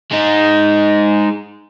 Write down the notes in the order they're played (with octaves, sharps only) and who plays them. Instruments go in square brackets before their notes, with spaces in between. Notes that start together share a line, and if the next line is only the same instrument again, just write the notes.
[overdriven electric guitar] G#3 D#4